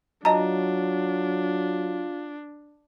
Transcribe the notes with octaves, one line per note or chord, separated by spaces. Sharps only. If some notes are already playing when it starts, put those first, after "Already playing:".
F#3 D4 F4 D#5 A5 A#5